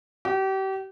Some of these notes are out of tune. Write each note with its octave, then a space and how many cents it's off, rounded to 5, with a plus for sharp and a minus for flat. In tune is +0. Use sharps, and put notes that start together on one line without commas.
G4 -35